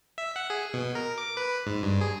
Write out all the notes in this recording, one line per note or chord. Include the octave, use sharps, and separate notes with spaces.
E5
F#5
G#4
B2
A#4
D6
B4
G#2
G2
G#4